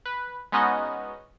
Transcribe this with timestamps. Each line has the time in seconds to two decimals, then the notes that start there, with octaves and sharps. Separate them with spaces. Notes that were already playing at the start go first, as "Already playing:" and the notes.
0.06 B4
0.52 G#3 B3 C#4 D#4 F#4 D#5